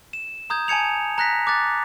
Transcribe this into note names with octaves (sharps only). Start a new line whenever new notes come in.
E7
A#5 D#6 G6 G#6
G#5 A5 G#6 C#7 F7
A#5 F#6 A#6 B6
D6 F#6 A6